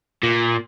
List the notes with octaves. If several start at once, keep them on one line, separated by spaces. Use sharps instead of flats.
A#2